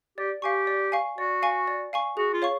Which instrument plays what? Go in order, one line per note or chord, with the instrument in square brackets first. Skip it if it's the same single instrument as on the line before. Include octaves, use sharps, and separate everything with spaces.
[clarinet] G4 [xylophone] D5
[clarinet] G4 [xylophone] F5 G#5 C#6
[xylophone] D5
F5 G#5 C#6
[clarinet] F#4 [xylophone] D5
[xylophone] F5 G#5 C#6
D5
F5 G#5 C#6
[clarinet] F#4 [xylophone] G#4
[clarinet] F4
[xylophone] C#5 F5 C#6